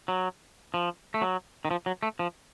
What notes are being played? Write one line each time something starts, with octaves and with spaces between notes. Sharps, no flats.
F#3
F3
A3
F#3
D#3
F3
F#3
A3
F3